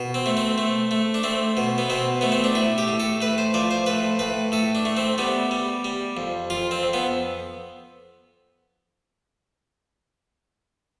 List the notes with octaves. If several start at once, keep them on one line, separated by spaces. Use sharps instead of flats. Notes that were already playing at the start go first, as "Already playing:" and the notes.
Already playing: B2
C4
A3
C4
A3
A3
D4
A3 C4
B2
B3
B2 C4
A3 B3
C4
D4
A2 E4
G4
A2
A4
A2 B4
C5
F3 D5
C5
A2 B4
A2 B4
A2 A4
D4
A3
C4
G3 B3
G3
G3
F2
F2 F4
C4
F2
B3